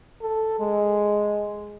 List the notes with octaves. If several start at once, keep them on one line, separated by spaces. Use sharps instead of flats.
A4
G#3